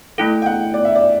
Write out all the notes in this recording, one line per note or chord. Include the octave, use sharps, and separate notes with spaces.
A3 E4 A4 G5
G5
F#5
D5
E5
D5